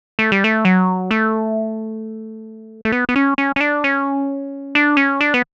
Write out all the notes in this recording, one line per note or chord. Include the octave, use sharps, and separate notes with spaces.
A3
G3
A3
F#3
A3
A3
B3
B3
C#4
C#4
C#4
D4
C#4
D4
C#4
D4
B3